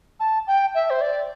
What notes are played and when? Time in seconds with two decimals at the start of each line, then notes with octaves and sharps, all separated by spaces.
0.20 A5
0.47 G5
0.75 E5
0.90 C5
1.01 D5